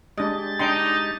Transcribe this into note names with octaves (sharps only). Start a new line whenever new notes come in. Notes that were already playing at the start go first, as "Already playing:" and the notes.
G#3 D4 G4 D#5 A6
D4 D#4 G5 C6